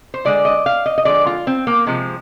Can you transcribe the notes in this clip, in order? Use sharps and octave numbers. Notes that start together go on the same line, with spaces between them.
C5
D3 G#3 D5
D#5
F5
D#5
D#5
D3 F3 G#3 D5
F4
C4
A#3
C3 F3 G#3